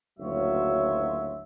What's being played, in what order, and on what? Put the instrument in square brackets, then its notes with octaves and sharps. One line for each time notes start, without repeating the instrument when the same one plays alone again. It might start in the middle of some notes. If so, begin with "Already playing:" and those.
[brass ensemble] F#1 D2 F#3 F4 C#5 E5